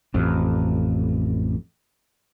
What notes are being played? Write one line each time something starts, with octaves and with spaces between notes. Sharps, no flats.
A1 F2